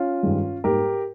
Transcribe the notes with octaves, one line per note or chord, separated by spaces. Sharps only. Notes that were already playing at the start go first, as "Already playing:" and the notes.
Already playing: C#4 F4
G2 D#3 G#3
G#2 G3 A#3 G4 A#4